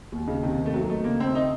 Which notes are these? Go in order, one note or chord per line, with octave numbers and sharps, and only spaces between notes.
D#2
C#3 D#4
C3 D#3
A#3
A3
F2 F#3
A3 D#4
C#3 A#3
A3 C4
D#4